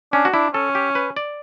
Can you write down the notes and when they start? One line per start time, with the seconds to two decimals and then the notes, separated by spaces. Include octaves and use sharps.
0.13 C#4 D4
0.25 F#4
0.34 D4 E4
0.54 C#4 A4
0.75 G4
0.95 B4
1.17 D5